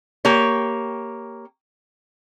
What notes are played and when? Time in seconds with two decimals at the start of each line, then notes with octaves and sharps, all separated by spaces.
0.25 A#3 G4 C#5